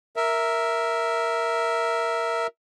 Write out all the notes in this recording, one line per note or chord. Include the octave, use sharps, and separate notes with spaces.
A#4 E5